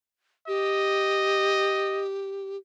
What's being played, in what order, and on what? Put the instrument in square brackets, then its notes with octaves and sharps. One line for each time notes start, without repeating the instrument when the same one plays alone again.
[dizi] G4 [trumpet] D#5